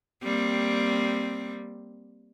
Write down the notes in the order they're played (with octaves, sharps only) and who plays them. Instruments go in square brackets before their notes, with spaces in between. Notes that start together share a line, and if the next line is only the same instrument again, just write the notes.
[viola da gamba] G3 A#3 C4